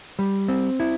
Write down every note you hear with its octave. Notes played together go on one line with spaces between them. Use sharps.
G3
C4
E4